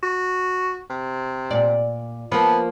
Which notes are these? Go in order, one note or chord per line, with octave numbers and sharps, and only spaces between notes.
F#4
C3
A#2 D5
F3 A#3 B3